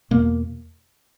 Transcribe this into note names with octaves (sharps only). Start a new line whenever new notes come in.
E2 B2 A#3